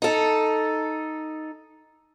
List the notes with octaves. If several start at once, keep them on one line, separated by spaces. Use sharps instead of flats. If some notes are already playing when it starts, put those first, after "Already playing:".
D#4 A4